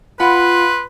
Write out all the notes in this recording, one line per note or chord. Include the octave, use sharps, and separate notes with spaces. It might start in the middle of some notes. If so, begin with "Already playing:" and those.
F4 B4 F#5 B5 C6